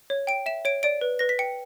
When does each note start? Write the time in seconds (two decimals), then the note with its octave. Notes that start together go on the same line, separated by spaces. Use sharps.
0.10 C#5
0.27 G5 D7
0.46 E5 E7
0.65 C#5 D7
0.83 D5 D7
1.01 B4
1.19 B4 A#6
1.29 B6
1.39 G5 C#7